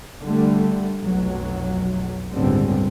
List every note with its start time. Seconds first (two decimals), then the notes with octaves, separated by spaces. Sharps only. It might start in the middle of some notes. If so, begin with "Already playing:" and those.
0.21 D3 G3 A3
1.03 F1 B1 F#3
2.32 G1 C#2 A2 D3 G3 C4